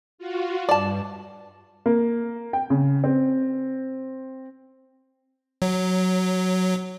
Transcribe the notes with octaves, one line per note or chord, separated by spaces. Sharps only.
F4 F#4
G2 D5 A5
A#3
G5
C#3
C4
F#3